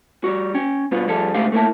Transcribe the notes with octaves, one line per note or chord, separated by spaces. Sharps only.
G3 F#4
C#4 G5
G2 B2 B3 F4
F3 G3 G#4 A4
G#2 C#3 A3 G4 F5
A3 A#3 E4 A5